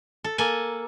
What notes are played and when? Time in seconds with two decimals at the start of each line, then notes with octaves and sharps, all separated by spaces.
0.24 A4
0.38 A#3 A4 G#5